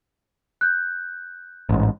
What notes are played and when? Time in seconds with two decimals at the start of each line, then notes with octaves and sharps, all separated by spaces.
0.61 F#6 G6
1.69 A1 G#2